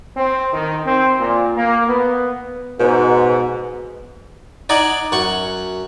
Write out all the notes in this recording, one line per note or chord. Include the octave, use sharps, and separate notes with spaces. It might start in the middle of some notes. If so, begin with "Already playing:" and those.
C4
D#3
C4
A#2
A#3
B3
G#2 B2
D#4 D5 D#5 F#5 G#5
F#2 F#5 C#6